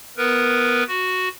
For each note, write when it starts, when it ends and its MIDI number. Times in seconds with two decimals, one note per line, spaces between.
0.17 0.83 59
0.17 0.83 70
0.17 0.83 71
0.88 1.29 66